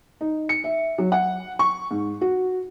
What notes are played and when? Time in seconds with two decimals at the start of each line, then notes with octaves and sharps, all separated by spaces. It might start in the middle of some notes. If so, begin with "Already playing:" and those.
0.21 D#4
0.49 C#7
0.64 E5
0.98 F#3
1.12 F#5
1.59 C#6
1.91 G#2
2.21 F#4